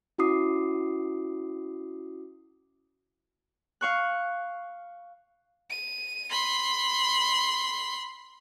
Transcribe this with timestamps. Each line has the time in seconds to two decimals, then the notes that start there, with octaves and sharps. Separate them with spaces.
0.18 C#4 E4 F#4 D6 D#6 C7
3.81 F5 C#6 F#6
5.70 D#7
6.31 B5 C6